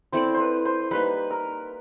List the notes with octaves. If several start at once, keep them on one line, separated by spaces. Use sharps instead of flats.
C4 E4 A4 C5 D5
C5
B4
C5
G3 A#3 D#4 B4
A#4